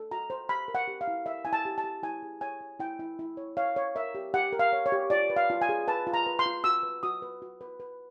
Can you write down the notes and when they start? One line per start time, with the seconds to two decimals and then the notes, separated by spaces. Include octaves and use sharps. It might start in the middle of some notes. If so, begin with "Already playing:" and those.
Already playing: A4
0.11 F#4 A#5
0.30 C5
0.49 G4 B5
0.68 A#4
0.75 F#5
0.88 G4
1.01 F5
1.08 E4
1.26 A#4 E5
1.45 E4 G#5
1.53 A5
1.65 G4
1.78 A5
1.84 G4
2.03 E4 G#5
2.23 G#4
2.41 C#5 G#5
2.61 C#5
2.80 E4 G5
2.99 E4
3.19 E4
3.37 C#5
3.57 C#5 F5
3.76 C#5
3.95 A#4 E5
4.15 G4
4.34 G4 F#5
4.52 A#4
4.59 F5
4.73 C#5
4.86 C#5
4.92 G4
5.10 F4 D5
5.30 B4
5.36 F5
5.50 F4
5.61 G#5
5.69 G#4
5.87 B4 A5
6.07 F4
6.14 A#5
6.27 B4
6.39 C6
6.46 F4
6.64 F#4 E6
6.83 B4
7.03 F#4 D#6
7.22 B4
7.42 F#4
7.61 B4
7.80 B4